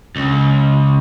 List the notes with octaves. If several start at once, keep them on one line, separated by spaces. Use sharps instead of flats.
C#2